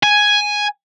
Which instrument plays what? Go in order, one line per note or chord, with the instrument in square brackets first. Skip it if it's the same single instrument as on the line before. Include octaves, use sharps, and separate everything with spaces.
[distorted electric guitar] G#5